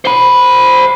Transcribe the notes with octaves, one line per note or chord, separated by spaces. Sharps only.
C5 B5